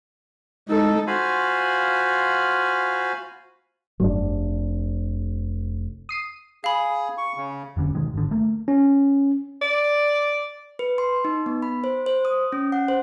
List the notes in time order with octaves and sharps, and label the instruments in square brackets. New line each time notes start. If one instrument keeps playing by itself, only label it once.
[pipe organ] G#3 [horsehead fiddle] D#4 A4
[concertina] F4 F#4 C5 F5 G#5 B5
[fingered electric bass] F1 D4 [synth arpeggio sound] G2 F#3
[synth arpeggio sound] D#6 C7 D#7
[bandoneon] G#4 [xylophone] F5 B5
[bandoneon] C#6
C#3
[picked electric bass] F1 D3 C#4
B1 D#3 G#3
G#1 D3
A3 A#3
[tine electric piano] C#4
[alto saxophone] D5
[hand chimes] B4
C6
D#4
B3
B5
C5
C5
D#6
C#4
F#5
C5